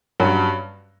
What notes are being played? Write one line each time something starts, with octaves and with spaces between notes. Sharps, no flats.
G2 F#3 C#4